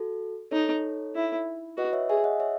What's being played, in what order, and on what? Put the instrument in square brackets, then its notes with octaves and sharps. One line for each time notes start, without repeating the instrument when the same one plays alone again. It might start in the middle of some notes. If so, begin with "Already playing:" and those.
Already playing: [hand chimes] F#4 A4
[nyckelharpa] D#4 [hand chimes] A4 C#5
[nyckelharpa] E4
[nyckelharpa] F#4 [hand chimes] B4 D#5
[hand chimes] C#5 E5
[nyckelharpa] G#4 [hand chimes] E5 G#5
[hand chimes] D#5 F#5
C#5 E5